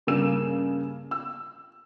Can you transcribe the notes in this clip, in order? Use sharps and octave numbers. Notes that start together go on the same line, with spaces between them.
G2 C#3 G3 A#3 E6 E7
E6